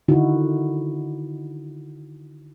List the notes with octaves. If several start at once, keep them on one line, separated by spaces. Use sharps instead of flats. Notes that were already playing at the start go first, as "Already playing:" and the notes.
D3 D#3 D#4 E4 F#4